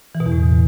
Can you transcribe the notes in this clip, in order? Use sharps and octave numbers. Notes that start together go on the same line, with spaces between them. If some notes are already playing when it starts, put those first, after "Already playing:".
E3
B2
E2
A2